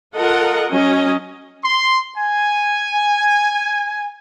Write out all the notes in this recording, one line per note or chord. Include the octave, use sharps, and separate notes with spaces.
F4 A4 A#4 D#5 F#5
F#3 C#4 D#5
C6
G#5